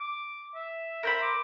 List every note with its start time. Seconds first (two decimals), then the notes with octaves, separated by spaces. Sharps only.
0.01 D6
0.55 E5
1.03 A#4 C5 B5
1.22 D6